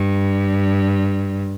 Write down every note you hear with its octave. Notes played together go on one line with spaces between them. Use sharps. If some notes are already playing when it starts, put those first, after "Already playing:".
Already playing: G2